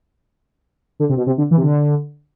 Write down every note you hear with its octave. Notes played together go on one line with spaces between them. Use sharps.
D3
C3
B2
C3
D3
E3
C3
D3